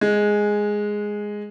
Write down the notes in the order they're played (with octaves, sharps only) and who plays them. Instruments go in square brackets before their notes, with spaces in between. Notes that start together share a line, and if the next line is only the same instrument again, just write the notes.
[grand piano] G#3